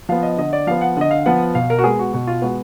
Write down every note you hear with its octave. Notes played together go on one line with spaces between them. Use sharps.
F3 B3 F5
D#5
D3 D#5
D5
F3 B3 F5
F#5
D3 D#5
F5
F3 B3 F#5
B2 F5
A#4
F#4
G#3 B3 G#4
F#4
B2 F#4
F4
G#3 B3 F#4